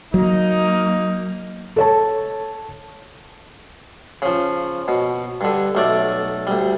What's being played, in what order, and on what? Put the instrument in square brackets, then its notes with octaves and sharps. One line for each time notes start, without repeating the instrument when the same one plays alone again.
[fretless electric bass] F#3 [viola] A#3 [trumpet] D#4
[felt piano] A4 C#5 A5
[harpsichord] C#3 F3
B2
G2 D3
B1 A3 D5
D2 G3